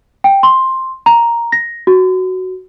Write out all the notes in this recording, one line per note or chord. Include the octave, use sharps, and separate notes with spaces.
G5
C6
A#5
A#6
F#4